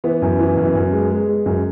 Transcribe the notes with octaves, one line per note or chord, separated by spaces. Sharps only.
E3 B3
F#2
E3
F#2
F#2
G#3
G#3
G#3
F#2